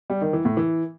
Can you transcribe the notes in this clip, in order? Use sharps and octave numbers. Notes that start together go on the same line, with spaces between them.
G3
D#3
E3
A2
E3